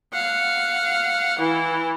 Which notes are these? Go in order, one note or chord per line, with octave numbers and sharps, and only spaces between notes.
F5 F#5
E3 E4